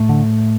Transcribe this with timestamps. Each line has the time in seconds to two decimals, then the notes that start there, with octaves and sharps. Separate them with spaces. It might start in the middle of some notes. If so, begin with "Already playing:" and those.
Already playing: A2 A3
0.09 D3